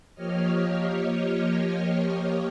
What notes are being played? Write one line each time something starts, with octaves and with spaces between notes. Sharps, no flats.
F3 A#3 G4 C#5 D#5 F6